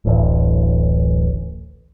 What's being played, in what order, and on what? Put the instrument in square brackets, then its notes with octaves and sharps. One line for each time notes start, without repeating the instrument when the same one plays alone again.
[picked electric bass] D1 A1